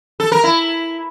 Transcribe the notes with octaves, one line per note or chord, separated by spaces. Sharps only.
A4
A#4
E4